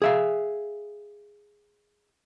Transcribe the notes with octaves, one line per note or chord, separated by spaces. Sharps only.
G#4 E5 F5